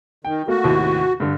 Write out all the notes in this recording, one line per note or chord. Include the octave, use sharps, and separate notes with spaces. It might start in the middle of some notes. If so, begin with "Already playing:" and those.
D#3 G5
A3 A#3 F#4
D#2 A2 C3
G2 D3